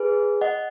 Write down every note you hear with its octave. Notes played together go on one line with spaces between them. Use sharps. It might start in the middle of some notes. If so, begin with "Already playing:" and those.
Already playing: G#4 B4
D#5 F#5